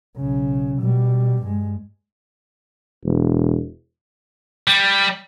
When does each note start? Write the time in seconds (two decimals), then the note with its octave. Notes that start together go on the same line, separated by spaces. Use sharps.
0.17 B1 C#3
0.78 B2 G3
1.43 G2 G#3
3.05 E1
4.68 G3